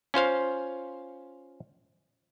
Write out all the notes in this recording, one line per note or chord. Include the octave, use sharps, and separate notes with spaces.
C#4 F4 C5 F5